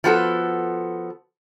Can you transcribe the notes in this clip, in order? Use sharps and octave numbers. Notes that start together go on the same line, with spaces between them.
F3 B3 F#4 A4